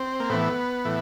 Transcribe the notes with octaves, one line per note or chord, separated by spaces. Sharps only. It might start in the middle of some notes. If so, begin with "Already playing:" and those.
Already playing: C4
A#3
A2 E3 B3
A2 E3